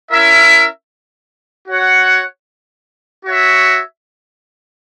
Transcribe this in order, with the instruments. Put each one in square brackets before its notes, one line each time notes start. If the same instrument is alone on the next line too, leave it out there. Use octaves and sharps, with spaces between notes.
[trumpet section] C#4 E4 A#4 E5
F#4 C#5 F#5
F#4 C#5 E5